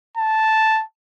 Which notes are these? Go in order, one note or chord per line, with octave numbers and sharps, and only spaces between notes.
A5